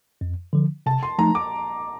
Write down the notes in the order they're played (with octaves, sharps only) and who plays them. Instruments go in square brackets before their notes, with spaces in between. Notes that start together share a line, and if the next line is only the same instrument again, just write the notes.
[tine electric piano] F2
D3 F3
[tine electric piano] C3 [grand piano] A5
[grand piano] C6
[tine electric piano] F3 A3 D#4 [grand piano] A#5
[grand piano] D6